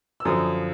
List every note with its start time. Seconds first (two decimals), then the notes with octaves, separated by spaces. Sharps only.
0.20 E6
0.25 F#2 D3 F3 D#6